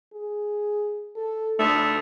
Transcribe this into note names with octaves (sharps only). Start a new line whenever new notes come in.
G#4
A4
A3 D4